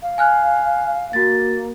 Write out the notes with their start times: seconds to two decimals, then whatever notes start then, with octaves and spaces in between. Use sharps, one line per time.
0.02 F5
0.18 G#5 F6 F#6
1.13 A#3 F#4 A6